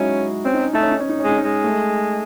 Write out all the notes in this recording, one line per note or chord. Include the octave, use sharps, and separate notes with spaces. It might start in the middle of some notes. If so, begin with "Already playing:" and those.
Already playing: F#3 G#3 C#4 D#4 E4 F#4
C4 C#4
D#4
C#4
A3 D#4
C#4
D#4
C#4
D#4
C#4
G#3 D#4
C#4
G#3
A3